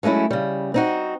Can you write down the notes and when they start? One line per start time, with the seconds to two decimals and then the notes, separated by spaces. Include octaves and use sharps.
0.03 F#3 G#3 A3 C#4 E4
0.31 C#3 G3
0.74 C4 D#4 F#4